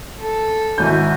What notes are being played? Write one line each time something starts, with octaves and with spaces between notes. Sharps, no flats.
A4
G#1 E4 F#4 G#5 G6